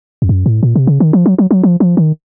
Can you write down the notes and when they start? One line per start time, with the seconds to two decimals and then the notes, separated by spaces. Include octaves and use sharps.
0.22 F2
0.29 F#2
0.46 A2
0.63 A#2
0.76 C3
0.87 C#3
1.00 D#3
1.13 F3
1.26 F#3
1.38 F#3
1.51 F#3
1.63 F3
1.80 F3
1.97 D#3